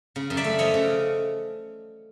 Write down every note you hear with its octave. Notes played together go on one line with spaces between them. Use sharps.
C#3
F#2
D5 E5
A3
F3 C#5 D#5
C#3